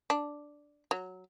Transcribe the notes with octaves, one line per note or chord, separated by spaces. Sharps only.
D4
F#3